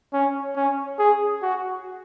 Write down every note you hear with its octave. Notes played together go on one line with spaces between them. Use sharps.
C#4
C#4
G#4
F#4